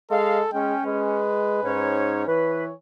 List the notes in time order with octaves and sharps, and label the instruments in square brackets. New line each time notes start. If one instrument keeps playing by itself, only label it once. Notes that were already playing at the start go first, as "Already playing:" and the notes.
[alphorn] G#3 [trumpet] A4 [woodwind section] D#5 F5
[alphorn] G#3 [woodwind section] C#4 [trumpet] G5
[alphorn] G#3 [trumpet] B4
[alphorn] G#2 [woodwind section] C#4 D#4 C#5
[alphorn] E3 [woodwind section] B4 [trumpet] C#5